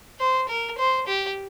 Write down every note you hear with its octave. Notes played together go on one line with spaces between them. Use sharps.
C5
A#4
C5
G4